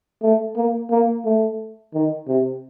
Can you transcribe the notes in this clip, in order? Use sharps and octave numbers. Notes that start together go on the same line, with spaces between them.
A3
A#3
A#3
A3
D#3
C3